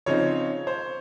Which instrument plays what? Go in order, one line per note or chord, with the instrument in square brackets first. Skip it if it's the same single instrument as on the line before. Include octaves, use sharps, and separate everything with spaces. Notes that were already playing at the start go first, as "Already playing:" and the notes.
[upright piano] C#3 F3 C4 D#4 [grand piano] C#5
[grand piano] C5